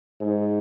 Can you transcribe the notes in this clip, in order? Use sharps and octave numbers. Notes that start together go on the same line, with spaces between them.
G#2